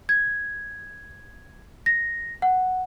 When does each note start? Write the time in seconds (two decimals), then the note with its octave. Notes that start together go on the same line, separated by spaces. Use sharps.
0.09 G#6
1.86 A#6
2.42 F#5